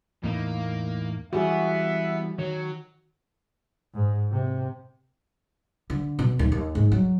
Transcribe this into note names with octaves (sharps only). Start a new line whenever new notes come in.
E2 A2 A#3 D#4
E3 G3 B3 F#4 G#4 E5
D#3 F#3 C#5
G#2
C3
D3
B2
D#2
D#2
G#2
F#3